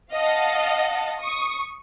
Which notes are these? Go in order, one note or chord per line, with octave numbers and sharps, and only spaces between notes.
D#5 F5 F#5 A5
C#6 D#6